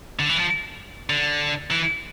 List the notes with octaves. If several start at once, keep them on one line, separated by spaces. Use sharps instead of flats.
D3
E3
F3
D3
E3